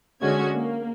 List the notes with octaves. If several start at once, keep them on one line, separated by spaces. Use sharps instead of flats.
D3 G#3 C#4 F#4 G#6
A#3